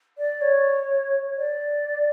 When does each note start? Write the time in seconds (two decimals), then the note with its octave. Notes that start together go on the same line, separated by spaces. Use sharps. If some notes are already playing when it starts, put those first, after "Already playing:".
0.18 D5
0.42 C#5
1.37 D5